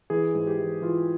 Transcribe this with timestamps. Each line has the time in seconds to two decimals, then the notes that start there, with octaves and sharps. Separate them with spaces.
0.10 E3 G#4
0.35 G#2
0.47 G4
0.59 E3
0.82 E3 F4